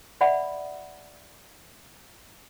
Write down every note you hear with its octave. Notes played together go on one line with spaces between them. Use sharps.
D5 E5 F#5 B5